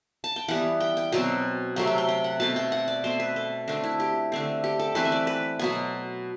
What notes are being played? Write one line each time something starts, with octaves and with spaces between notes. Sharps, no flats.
A5
G5
E3 G3 B3 F#5
G5
G5
B2 F#3 C4 G5
C3 F#3 A3 C4 G5
G5
G5
G5
F#5
B2 A3 C4 A5
G5
F#5
D5
B2 A3 C4 C5
B4
A4
D3 A3 C4 D4
E4
G4
D3 A3 C4
G4
A4
E3 A3 C4 B4
E5
D5
B4
B2 F#3 B3